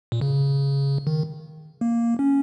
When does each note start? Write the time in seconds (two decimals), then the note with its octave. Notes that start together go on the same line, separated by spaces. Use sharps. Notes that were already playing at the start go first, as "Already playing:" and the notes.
0.12 A#2
0.21 C#3
1.07 D#3
1.81 A#3
2.19 C#4